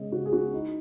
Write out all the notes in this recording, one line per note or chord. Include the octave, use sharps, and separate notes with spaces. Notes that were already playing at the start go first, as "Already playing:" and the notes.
Already playing: C#3 G#3 B3 D#5
C#3 F#4
G#4
B3 F#4
D#4 E4